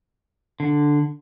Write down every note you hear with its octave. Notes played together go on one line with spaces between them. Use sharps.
D3